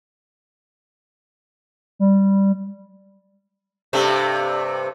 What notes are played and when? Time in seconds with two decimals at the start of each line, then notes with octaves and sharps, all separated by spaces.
1.99 G3
3.93 G2 C3 A3